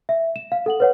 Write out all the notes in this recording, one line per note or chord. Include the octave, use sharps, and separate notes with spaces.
E5
E7
F5
A4 F#5 F#7
B4 C#5 F#5